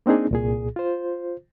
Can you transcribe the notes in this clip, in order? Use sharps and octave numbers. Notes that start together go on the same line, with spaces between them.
A#3 C4 D4 D#4 G#4
C2 A#2 G#4
F4 C5